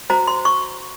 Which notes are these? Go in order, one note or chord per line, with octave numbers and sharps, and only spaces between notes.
F#4 C5 A#5
C6
C#6